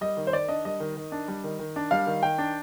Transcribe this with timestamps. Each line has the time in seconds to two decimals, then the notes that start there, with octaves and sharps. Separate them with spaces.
0.01 G3 D#5
0.17 D#3
0.27 C5
0.33 D#3 D5
0.48 D4 D#5
0.65 G3 D#5
0.80 D#3
0.96 D#3
1.12 D4
1.28 G3
1.44 D#3
1.59 D#3
1.76 D4
1.91 G3 F5
2.07 D#3
2.23 D#3 G5
2.38 D4